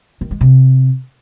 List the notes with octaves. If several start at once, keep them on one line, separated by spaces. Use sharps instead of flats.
D#3
G#3
C3